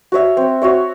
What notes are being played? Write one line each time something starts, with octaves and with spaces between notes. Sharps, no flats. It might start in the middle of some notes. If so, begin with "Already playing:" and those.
F#4 C#5 E5
C4
F#4 C#5 E5